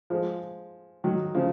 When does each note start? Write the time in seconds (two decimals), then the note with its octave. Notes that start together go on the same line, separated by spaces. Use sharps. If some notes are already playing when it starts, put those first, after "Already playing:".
0.10 F3 G#3
1.04 D#3 F#3
1.35 C#3 F3